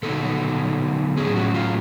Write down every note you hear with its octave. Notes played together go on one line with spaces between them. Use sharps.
D3 F#3 B3 D#4 A4
A2 F#3 A3 C#4 G#4
F#4
F4